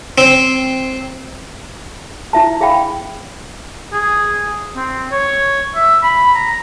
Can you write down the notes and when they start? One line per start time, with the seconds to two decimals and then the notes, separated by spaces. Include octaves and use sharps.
0.18 C4
2.33 E4 E5 A5
2.61 G#4 E5 F5 G5 B5
3.93 G#4
4.76 C4
5.12 C#5
5.75 E5
6.03 B5
6.35 A#5